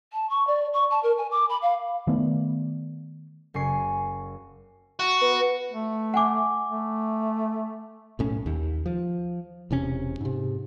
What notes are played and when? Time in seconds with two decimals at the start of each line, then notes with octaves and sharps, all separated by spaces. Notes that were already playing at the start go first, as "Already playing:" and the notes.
0.12 A5
0.29 C#6
0.47 D5
0.73 C#6
0.90 A5
1.03 A#4
1.17 G#5
1.31 D6
1.49 B5
1.62 F5
2.07 D#3 A3 B3 D4
3.54 F#1 G#5 C#6 C7
4.99 F#4
5.21 B3
5.72 A3
6.14 F#5 G#5 D6
6.69 A3
8.19 B1 A2 C#4
8.46 D#2
8.86 F3
9.71 E1 C3 C#4
10.21 G#2 C3